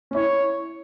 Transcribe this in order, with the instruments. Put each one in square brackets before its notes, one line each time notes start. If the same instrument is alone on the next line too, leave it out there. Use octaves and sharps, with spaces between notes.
[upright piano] C#4
[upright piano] E4 [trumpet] C#5